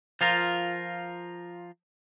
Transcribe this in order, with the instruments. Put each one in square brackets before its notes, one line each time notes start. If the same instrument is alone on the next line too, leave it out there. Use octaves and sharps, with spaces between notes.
[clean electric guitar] F3 F4 A#4